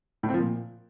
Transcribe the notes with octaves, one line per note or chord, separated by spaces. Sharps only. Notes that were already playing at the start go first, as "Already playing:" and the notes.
A2
C4
F3
A#2